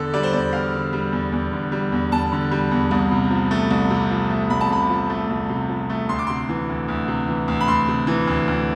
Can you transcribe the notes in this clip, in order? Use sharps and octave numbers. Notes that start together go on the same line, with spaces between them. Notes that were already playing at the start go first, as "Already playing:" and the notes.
Already playing: E2 D3 A4
G3 D5
C5
E2 D5
E2 F5
D3
G3
E2
E2
D3
G3
E2
E2 A5
D3
G3
E2
C2
C3
F3
A3
C2
C3
F3
A3
C2 B5
A5
C3 B5
F3
A3
C2
C3
F3
A3
D2 C6
D6
C3 C6
E3
D2
D2
C3
E3
D2
B5
D2 C6
C3
E3
D2
D2